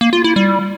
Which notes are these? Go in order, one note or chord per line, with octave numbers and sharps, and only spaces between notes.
A#3
F4
E4
G3